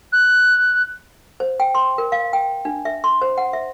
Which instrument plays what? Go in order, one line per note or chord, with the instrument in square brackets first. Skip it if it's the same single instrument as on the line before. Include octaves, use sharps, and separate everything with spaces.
[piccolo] F#6
[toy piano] C5
G5
C6
A#4
F5
G5
D4
E5
C6
C5
F#5
E5